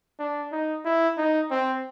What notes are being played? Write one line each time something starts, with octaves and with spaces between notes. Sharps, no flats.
D4
D#4
E4
D#4
C4